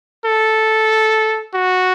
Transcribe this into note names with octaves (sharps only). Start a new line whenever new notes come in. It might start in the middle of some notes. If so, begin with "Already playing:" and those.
A4
F#4